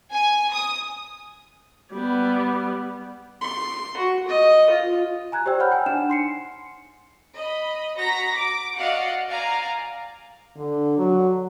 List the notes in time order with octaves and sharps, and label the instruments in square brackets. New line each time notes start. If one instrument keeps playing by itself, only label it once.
[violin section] G#5
D#6
[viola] G3 B3
[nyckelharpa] C6
F#4
D#5
F4
[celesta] G#5 A#5 F#6 G#6
G4 C5 D5 G5 E6
C5 C#5 F#5 B5 F6 G6
G5 G#5
D4 D#4 F#5 G#5 E7
C6 C7 C#7
[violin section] D#5 B5
F#4 A#5 A#6 B6
D6
F#4 D5 D#5 F5 F#5
D5 F5 G#5 A#5
[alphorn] D3
F#3